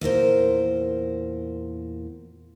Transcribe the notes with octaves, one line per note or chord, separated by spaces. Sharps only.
E2 A#2 A#4 C5